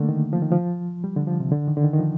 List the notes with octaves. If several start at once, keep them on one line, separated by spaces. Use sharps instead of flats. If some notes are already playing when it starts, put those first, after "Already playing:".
Already playing: D3 A3 A#3
D#3
F3
D#3
F3
G3
D3
F3
C3
D3
D#3
D3
D#3
D#3
F3